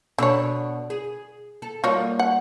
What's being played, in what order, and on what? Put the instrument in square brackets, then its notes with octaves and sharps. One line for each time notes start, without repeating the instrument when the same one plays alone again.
[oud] B2 D4 [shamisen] D3 C#5
[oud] G#4
A4
[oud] G3 A#3 D#4 [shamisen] F4 F#4 C#5
[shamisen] F#5